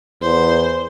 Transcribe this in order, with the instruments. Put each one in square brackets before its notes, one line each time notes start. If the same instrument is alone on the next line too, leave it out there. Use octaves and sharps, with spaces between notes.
[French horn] E2 [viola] C5